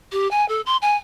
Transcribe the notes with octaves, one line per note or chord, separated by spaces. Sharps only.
G4
G#5
A4
C6
G#5